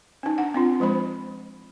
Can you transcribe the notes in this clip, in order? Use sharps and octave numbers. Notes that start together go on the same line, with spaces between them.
C#4 D#4
D4 F#5
C4 D4 F4
F3 G#3 C5 B5